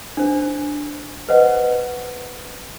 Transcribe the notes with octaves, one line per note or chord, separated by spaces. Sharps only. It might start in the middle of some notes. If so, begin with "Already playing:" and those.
D4 C5
B4 C5 D#5 F#5